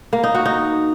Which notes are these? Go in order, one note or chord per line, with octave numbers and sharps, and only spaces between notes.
A#3
D#4
F#4
D#4